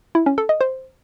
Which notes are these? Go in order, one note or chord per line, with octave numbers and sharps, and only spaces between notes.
E4
C#4
A4
D#5
C5